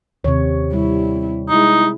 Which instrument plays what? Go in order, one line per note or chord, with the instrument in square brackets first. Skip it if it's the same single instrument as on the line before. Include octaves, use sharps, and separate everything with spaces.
[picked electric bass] D#2 [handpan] C3 C#5
[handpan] G3 [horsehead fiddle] E4
[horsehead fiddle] G#3 E4 [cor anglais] D#4